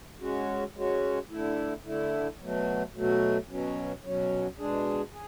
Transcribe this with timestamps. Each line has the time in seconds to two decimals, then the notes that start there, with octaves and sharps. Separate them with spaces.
0.20 G#3 C#4 F#4
0.75 G#3 C#4 F#4
1.30 D3 A3 E4
1.84 D3 A3 E4
2.39 B2 F#3 A3
2.94 B2 F#3 A3
3.49 B2 F#3 C#4
4.03 B2 F#3 C#4
4.58 B2 G#3 D4 G#4
5.13 G#4